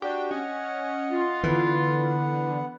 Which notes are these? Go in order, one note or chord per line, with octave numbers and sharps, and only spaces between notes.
D4 F#4 G4 G5
C#4 D#5 F#5
F4
D3 E3 B3 F#5